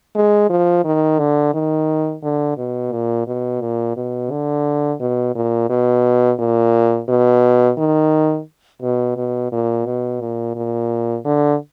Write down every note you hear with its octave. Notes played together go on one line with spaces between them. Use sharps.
G#3
F3
D#3
D3
D#3
D3
B2
A#2
B2
A#2
B2
D3
B2
A#2
B2
A#2
B2
D#3
B2
B2
A#2
B2
A#2
A#2
D3